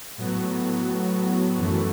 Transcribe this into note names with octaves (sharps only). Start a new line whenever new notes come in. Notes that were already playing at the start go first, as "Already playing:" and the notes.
A2 F#3 B3 F#4
F#2 E3 A3 F#4